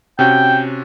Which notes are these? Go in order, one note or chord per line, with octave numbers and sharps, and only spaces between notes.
C3 C#4 F#4 G5